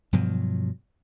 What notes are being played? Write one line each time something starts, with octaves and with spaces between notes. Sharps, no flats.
G2 B2 F3 F#3